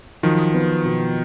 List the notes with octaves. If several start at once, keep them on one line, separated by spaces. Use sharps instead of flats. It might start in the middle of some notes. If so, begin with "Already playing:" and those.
D#3 F3 F#3
B3
B2